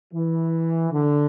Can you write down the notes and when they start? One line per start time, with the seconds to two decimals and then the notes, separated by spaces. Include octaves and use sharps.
0.14 E3
0.91 D3